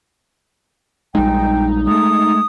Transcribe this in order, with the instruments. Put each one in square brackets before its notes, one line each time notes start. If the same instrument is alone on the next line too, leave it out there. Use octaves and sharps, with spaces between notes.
[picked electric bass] A#1 G3 G#3 [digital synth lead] D#4 [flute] G5
[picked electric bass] G#3 A3 [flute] D#6